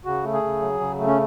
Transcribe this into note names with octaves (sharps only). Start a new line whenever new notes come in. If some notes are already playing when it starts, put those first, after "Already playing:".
C#3 F#4
A3
G#4
C#3
F#3
C#3
A3
C#4